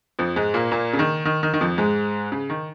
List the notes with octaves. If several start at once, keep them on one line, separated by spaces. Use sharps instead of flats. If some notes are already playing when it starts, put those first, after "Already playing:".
F2 F3
G#2 G#3
A#2 A#3
A#2 A#3
C#3
D#3
D#3
D#3
D#3
F2 F3
G#2 G#3
C#3
D#3